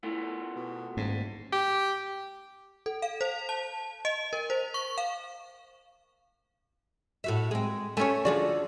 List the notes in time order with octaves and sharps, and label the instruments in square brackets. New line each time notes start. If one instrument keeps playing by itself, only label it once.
[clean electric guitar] A3 B3 F4 [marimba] E4
[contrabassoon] B2
[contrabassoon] D#1 [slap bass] G#2
[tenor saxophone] G4
[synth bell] A4
F5
C5
A5
D#5
A#4
C5
C#6
F5
[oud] A2 F#4 E5
G#3 C4
[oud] A3 C#5 [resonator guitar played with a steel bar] C#4 G#5
[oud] D3 F3 G#4 [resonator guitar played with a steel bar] F#4 D5